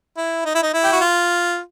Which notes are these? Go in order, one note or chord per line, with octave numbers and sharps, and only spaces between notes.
E4
D#4
E4
D#4
E4
G4
F#4
F4